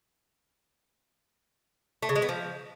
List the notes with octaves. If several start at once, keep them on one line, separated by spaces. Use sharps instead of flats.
A3
C#3
G#3
B3
F3